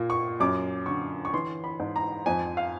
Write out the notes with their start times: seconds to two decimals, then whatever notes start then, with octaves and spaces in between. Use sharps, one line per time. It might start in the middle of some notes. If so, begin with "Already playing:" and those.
Already playing: A#2 A#3
0.10 C#6
0.40 F#2 D6
0.86 D3 C#6
1.25 C#6
1.34 E3 C6
1.64 B5
1.80 G#2
1.96 A#5
2.26 F2 G#5
2.57 F5